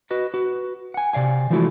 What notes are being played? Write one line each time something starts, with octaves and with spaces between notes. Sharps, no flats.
F#4 B4 D#5
F#4 B4
F#5 G#5
C3 D5 F5 G#5
E3 F3 G#3 A3 E4 F#4